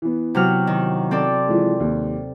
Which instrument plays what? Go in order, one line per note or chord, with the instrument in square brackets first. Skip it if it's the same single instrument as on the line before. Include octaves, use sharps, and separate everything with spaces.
[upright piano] E3 B3
[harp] C3 F#3 F6
D#3
C4 A4 D5
[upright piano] E3 F3 G#3
D#2